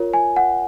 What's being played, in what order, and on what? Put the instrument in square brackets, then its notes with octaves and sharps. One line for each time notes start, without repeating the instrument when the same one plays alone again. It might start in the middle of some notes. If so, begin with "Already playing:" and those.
Already playing: [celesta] F4 A#4 C#5
G#5
F#5